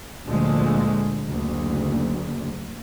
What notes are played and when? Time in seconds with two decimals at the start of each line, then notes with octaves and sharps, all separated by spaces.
0.25 D2 A#2 D3 F3 G#3 A3
1.26 F#1 D2